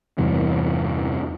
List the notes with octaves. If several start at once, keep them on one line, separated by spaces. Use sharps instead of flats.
E2 G2 C3 E3